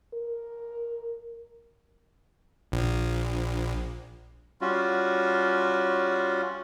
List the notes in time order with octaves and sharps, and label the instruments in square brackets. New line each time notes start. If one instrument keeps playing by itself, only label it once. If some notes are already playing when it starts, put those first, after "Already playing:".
[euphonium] A#4
[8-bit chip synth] A#1
[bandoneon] G3 C#4 F4 F#4